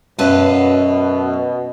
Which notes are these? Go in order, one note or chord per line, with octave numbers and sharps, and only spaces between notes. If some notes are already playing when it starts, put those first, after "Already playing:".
F#2 B2 B4 F5 A5